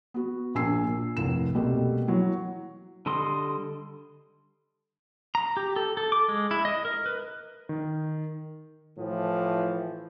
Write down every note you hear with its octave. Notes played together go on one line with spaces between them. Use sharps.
B3 F#4
A#1 A#3 G#5 E6 C7
A#2
F1 C2 A2 E7
B2 G3 A3 A#3 C4
E3 F#3
D3 G3 A4 D#5 C6
A#5
G4
A4
A4
D6
G#3
E4
D#5
A#4
B4
D#3
A2 E3 F3